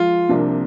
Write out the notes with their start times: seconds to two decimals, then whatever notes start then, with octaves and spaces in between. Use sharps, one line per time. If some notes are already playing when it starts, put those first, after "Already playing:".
Already playing: F3 G#3 F4
0.29 C2 C3 F3 A#3 D4